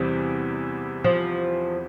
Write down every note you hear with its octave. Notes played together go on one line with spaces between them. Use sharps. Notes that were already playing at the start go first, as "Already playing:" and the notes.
Already playing: E2 C3 E3 G3 C4
F3